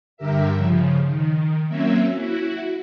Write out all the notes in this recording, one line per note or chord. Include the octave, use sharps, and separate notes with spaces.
G2 D3 G4 A#4 E5
C#3 F3
D#3
F#3 A#3 C4 C#4 E5
E4 F#4